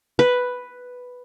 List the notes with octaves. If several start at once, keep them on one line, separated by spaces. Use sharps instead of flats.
B4